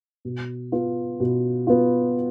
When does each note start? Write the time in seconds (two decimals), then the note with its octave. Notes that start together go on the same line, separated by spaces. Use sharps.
0.25 B2
0.72 B3 F4
1.20 B2
1.67 B3 F4